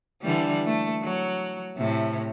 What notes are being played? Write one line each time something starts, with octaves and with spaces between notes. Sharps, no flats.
D3 E3 G3
A3
F#3
A2 C3